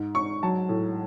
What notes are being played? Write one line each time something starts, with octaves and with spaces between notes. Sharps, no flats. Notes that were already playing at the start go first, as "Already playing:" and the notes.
Already playing: G#2
G#2 C#6
F#3 A5
A2